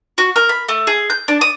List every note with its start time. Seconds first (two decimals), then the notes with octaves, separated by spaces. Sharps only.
0.18 F#4
0.36 A#4
0.49 B5
0.69 A3
0.87 G#4
1.10 G6
1.28 D4
1.41 D#6